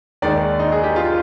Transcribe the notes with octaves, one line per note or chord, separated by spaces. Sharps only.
D#2 D#3 G#3 D5
D#4
G#4
G4
F4